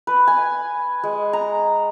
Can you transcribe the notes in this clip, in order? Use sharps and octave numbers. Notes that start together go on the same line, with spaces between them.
B4
G#5
G#3
A#5